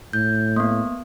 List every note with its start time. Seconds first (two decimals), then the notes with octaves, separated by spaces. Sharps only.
0.13 A2 G6
0.56 A#3 B3